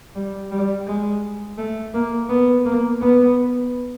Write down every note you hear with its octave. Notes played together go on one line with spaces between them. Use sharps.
G3
G3
G#3
A3
A#3
B3
A#3
B3